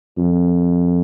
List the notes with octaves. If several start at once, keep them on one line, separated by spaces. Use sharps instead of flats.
F2